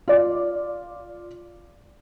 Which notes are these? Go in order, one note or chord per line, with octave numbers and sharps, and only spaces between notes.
F4 D5